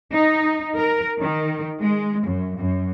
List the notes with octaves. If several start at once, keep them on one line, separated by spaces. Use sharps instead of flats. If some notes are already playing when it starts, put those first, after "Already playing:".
D#4
A#4
D#3
G#3
F#2
F#2